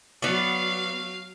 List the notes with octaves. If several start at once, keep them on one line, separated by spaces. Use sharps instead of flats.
F#3 B3 D5 F5